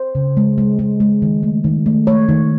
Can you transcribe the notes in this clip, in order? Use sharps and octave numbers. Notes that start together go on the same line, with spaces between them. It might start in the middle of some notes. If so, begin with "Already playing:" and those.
Already playing: C5
C#3
G#3
G#3
G#3
G#3
D#3
A3
D#3
A3
A3 C#5
D#3